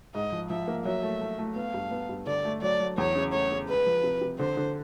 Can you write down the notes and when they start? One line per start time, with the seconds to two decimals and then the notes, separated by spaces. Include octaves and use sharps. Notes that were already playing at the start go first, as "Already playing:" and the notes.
0.15 G#2 D#5
0.32 F3
0.50 F3 E5
0.68 A#3
0.85 F#3 E5
1.03 A3
1.21 A3
1.39 A3
1.56 B3 F5
1.74 G2
1.91 B3
2.09 G2
2.27 D3 D5
2.45 A3
2.62 F#3 D5
2.80 F#3
2.98 E2 C#5
3.15 C#3
3.33 A3 C#5
3.51 C#3
3.68 G#3 B4
3.86 F3
4.04 C3
4.21 C3
4.39 D3 C5
4.57 D3